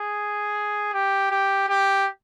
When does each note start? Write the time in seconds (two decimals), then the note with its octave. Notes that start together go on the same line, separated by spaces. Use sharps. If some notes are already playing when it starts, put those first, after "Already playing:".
Already playing: G#4
0.93 G4
1.31 G4
1.68 G4